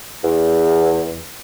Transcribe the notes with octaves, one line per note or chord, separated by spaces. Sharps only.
E2